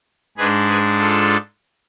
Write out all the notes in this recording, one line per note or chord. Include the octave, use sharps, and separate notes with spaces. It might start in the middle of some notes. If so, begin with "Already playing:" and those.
G#2 G#3 D4 G#4 B4
G#4 B4
F4 A4